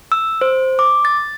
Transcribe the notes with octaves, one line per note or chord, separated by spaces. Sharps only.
E6
C5
D6
A6